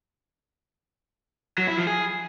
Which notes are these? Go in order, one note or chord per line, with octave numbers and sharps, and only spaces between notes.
F#3
E4
F3
G#4